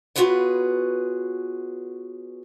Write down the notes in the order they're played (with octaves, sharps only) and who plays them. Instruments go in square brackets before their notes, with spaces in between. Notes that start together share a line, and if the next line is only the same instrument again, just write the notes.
[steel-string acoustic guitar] B3 F4 F#4 G#4 B4 C#5